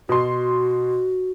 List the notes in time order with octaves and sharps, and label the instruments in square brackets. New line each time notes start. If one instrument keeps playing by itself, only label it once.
[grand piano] B2 C6 [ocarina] F#4